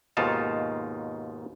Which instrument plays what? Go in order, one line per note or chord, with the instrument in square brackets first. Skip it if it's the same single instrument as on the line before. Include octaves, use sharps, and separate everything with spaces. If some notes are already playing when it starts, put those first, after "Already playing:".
[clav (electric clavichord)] D#2 G#2 B2 D#4 F4 A5